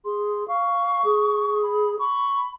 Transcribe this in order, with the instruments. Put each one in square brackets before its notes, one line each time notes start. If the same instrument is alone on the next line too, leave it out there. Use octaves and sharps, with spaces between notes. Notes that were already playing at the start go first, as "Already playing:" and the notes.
[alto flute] G#4 [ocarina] C6
[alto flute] F5 [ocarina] C#6
[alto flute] G#4
[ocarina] B5
[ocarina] B5 [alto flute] C#6